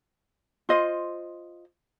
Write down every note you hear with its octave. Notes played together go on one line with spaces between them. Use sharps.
F4 C5 D#5